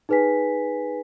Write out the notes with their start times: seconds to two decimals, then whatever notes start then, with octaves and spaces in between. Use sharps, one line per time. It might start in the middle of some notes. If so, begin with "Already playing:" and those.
0.09 D#4 G#4 B4 G#5 B6